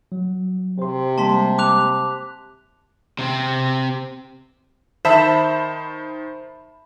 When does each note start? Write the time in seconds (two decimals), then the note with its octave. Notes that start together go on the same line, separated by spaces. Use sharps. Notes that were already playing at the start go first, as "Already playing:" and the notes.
0.12 F#3
0.79 C3 C5 C6
1.18 G3 G#3 A#3 A5 C6 B6
1.59 D6 F#6 F7
3.19 C3 C4
5.05 D#3 C5 E5 A5 B5